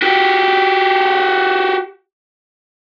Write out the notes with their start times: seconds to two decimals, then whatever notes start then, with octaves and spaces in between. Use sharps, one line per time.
0.02 F#4 G4